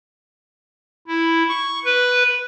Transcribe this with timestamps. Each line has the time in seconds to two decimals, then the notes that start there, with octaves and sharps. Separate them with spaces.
1.07 E4
1.49 C#6
1.85 B4